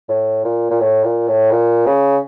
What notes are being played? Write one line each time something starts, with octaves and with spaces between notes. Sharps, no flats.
A2
A#2
A#2
A2
A#2
A2
A#2
C#3